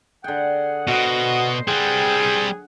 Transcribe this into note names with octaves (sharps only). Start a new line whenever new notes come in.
D3 G#4 F#5 G5
B2 F#4 C5 D#5
G3 C4 G#4 A#4 B4 F#5 G5